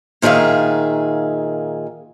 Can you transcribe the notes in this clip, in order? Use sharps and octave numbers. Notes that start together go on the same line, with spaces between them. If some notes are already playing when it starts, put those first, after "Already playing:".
A#2 D#3 G#4 E5 F5